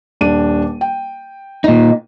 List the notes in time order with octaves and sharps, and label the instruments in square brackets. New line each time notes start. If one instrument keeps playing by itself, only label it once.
[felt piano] D#1 D4 D#7
G5
[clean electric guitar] A#2 D#4